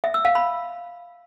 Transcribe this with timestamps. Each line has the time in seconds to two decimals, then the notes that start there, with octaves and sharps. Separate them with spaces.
0.04 E5
0.14 E6
0.25 F5
0.35 B5